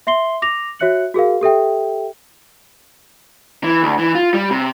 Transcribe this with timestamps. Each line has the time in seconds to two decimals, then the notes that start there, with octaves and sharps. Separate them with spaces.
0.07 E5 C6 C7 G7
0.42 D6 A#6 F7
0.79 F#4 C#5 E5 F#6 C#7 F#7
1.14 F#4 G#4 A#4 F5
1.41 G4 A4 E5 G5
3.64 E3
3.83 D2
3.99 E3
4.15 F4
4.34 G3
4.51 C3